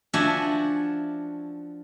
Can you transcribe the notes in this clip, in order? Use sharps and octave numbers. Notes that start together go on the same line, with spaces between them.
F3 D4 F#4 E5 G#5